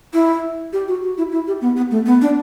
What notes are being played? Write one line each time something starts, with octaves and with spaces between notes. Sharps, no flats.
E4
G4
F#4
F#4
E4
E4
G4
B3
B3
A3
B3
D4